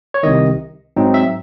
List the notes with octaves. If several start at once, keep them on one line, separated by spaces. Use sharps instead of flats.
C#5
C2 C3 D#3 D#5
G#2 F#3 C4 D#4
E5